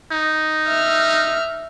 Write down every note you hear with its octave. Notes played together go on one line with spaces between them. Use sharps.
D#4
E5 F6